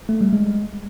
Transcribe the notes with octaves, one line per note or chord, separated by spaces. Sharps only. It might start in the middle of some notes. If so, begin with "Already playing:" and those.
A3
G3
G#3